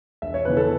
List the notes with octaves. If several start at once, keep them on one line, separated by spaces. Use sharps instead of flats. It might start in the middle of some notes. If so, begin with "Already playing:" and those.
E1 E5
C#5
E2 C#3 E3 B4
A4